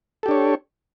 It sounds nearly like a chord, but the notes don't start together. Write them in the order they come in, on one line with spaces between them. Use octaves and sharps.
A4 G4 D4 C#5